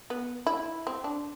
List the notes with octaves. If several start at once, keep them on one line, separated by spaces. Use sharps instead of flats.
B3
E4
C4
D4